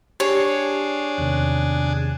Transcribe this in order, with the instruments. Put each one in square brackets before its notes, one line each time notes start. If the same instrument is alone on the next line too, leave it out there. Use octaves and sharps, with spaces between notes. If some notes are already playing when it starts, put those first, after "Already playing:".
[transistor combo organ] D4 G#4 [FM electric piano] G4 C7 [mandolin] C#5 [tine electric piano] A5 C#7
[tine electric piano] E2 C3 D#3 [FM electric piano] F#6